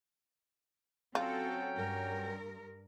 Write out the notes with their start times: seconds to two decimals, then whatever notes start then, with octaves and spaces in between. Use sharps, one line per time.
1.15 F#3 C4 C#4 F4 F#4 A4 G5
1.73 G2 A#4